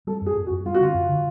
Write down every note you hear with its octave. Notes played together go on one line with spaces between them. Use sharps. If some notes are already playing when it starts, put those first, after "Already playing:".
G3 A4
F#2
G#4
F#2
F#4
F#2
G3 F4
F#4
D3 F4
F#2
D3